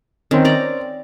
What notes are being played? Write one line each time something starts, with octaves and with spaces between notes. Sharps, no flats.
D#3 C4 C#4
D5 A#5